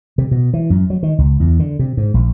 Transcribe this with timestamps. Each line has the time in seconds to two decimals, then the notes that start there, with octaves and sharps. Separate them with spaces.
0.18 C3
0.31 B2
0.54 E3
0.70 F#2
0.90 F#3
1.03 D#3
1.18 C#2
1.40 E2
1.60 D3
1.79 C3
1.97 G#2
2.14 A#1